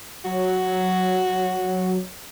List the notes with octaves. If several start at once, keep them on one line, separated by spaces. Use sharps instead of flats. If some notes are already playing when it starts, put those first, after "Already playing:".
F#3 F#4